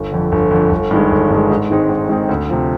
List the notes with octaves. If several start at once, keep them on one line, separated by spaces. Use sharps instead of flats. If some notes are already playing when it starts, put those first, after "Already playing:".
Already playing: G1
F2 D3
G1
F2 D3
G1
G2 D#3 G#3
G1
G2 D#3 G#3
G#2
D#3 G#3 C4 D#4
G#2
D#3 G#3 C4 D#4
D2
C3 F3